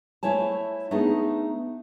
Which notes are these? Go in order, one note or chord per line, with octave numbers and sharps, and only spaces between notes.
A3 E4 C5 C#5 G#5 A5
A3 B3 D4 D#4 G#4